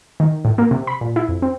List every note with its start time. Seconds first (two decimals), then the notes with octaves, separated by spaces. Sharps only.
0.20 D#3
0.45 A2
0.58 A#3
0.71 C3
0.87 B5
1.01 A#2
1.16 E4
1.29 F2
1.42 C4